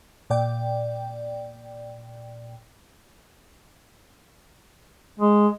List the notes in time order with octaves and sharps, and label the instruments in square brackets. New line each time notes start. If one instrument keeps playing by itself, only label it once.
[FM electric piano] A#2 D5 G5
[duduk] G#3